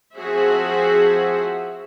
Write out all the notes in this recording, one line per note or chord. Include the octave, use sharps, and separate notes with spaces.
F3 C4 F#4 G#4 C5 E5